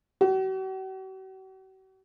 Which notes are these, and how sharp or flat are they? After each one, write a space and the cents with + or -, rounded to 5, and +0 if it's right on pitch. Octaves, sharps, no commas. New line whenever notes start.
F#4 +45